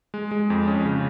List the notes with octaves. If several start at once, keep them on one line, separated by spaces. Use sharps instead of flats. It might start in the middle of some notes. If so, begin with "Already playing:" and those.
G#3
G#3
F2
C#4
C#3